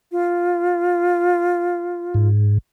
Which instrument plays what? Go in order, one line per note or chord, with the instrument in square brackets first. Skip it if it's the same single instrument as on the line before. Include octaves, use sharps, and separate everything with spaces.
[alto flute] F4
[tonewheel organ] G#2